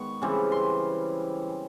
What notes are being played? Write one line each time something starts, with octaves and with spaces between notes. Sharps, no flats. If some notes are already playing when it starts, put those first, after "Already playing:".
Already playing: G#2 D#3 B3 C#6
C#3 E3 G3 C4
C6